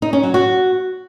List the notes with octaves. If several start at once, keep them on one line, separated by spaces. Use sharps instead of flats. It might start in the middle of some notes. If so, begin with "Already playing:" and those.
D#4
C#4
F#3
F#4